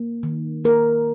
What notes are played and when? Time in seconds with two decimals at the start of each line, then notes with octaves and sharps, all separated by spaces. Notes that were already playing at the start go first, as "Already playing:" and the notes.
Already playing: A#3
0.23 D#3
0.65 A#3 A#4